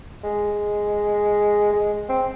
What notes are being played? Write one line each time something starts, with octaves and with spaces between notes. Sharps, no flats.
G#3
G#3
C4